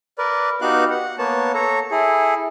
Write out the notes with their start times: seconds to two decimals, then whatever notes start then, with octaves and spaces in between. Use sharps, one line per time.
0.18 A#4 B4 D5
0.61 B3 D#4 F#4 G4 F5 F#6
0.91 F#5
1.18 A#3 B3 C#5 A5
1.54 A4 C#5 A#5
1.91 E4 G#4 A4